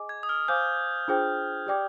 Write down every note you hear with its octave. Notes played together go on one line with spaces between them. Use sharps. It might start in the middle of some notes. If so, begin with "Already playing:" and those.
Already playing: G#4 D#5 G#5 D6
G#6
D#6
F6
C5 F5 G#5 D6 G6
D4 F4 G#4 C5 G5
G4 D5 G5 D6